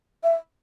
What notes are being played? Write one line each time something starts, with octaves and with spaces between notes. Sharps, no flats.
E5